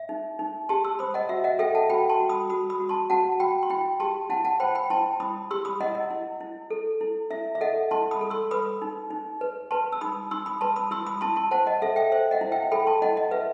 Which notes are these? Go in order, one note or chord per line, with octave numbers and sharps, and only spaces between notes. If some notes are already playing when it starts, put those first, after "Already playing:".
Already playing: E5
D#4
D#4
G4 A5 C6
C6 E6
C5 B5 D#6
D#5 F#5
F#4 E5
D#5 F#5
A4 E5 G5
F#5 A5
F#4 G5 B5
A5 C6
F#4
B5 D#6
F#4 B5 D#6
B5 D#6
F#4
A5 C6
F#4 F#5 A5
F#4 G5 B5
C6
E4 G5 B5
G4 A5 C6
E4 F#5 A5
F#5 A5
C5 G5 B5
G5 B5
E4 A5 C6
E4 B5 D#6
G4 C6 E6
B5 D#6
E4 D#5 F#5
D#5
E4
E4
A4
E4
E4 E5
E5
A4 D#5 F#5
E4 A5 C6
B5 D#6
A4
C6 E6
B4 B5 D#6
D#4
D#4
B4
B4 A5 C6
E6
D#4 B5 D#6
D#4 C6 E6
B5 D#6
B4 A5 C6
B5 D#6
E4 C6 E6
B5 D#6
E4 A5 C6
A5 C6
C5 F#5 A5
D#5 F#5
A4 E5
E5 G5
C5 E5
D#5 F#5
E4
E5 G5
A4 G5 B5
A5 C6
E4 D#5 F#5
D#5
B4 E5